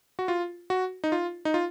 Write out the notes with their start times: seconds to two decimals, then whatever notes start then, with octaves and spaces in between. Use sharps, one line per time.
0.19 F#4
0.28 F4
0.70 F#4
1.04 D#4
1.12 F4
1.45 D#4
1.54 F4